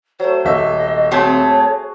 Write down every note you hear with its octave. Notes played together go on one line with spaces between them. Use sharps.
F#3 A3 C5
D#1 D#5 E5 E6
A3 C4 F#4 G#4 C5 C#5 A5